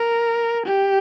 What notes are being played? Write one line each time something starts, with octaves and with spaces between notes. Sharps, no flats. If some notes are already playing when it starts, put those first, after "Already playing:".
Already playing: A#4
G4